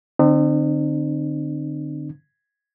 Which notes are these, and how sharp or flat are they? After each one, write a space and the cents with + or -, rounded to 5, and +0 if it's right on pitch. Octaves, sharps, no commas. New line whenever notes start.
D3 +15 C4 +0 D#4 -45